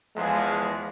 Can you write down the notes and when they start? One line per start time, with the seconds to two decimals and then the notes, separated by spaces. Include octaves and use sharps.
0.16 E2 F3 G#3